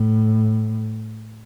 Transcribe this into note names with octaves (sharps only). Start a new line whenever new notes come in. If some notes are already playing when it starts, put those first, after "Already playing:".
Already playing: A2